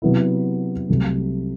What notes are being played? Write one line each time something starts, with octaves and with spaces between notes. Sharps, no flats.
C3 F#3 B3 E4
C2 C3 F#3 A3